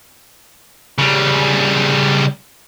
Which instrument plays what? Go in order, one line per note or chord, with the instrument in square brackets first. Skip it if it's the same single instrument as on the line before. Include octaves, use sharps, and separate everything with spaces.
[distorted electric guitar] C#3 G3